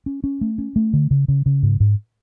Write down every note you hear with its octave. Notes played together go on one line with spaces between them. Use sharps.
C#4
C#4
A3
C#4
A3
D3
C#3
C#3
C#3
G#2
G#2